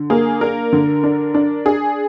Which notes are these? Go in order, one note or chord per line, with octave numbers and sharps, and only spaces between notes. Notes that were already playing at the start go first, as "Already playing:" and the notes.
Already playing: D3
A#3 G#4
D4 A#4
D3
D4
D4
D4 G#4